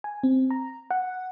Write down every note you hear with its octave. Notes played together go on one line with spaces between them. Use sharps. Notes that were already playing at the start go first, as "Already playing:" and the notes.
G#5
C4
A#5
F#5